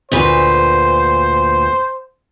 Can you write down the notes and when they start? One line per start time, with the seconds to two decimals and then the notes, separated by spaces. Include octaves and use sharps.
0.12 D2 A#2 B4 C5